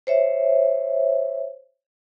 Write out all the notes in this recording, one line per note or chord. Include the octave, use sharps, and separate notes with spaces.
C5 C#5 E5